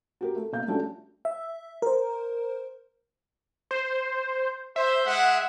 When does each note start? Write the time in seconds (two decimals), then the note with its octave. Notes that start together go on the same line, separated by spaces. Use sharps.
0.21 F#4 G4 A#4
0.36 A3
0.52 B2 A#3 F5 G6
0.68 G3 A3 C#4 D4 F4 F#4
1.25 E5
1.82 A#4 C5
3.71 C5
4.76 C5 E5
5.04 G#3 F#5